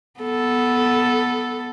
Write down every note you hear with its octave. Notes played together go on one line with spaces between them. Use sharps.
B3 A4